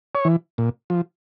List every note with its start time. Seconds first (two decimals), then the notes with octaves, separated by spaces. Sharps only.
0.15 C#5
0.25 E3
0.58 A#2
0.90 F3